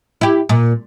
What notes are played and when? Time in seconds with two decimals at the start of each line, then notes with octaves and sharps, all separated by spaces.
0.21 E4 G4
0.49 A#2